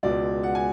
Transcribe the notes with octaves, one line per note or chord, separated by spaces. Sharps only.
C#2 B2 G#3 D5
F#5
G#5